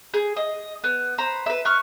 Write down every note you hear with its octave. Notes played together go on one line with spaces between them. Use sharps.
G#4
D#5
B3
C5 A#5 B5
B4 E5
B4 C#6 F6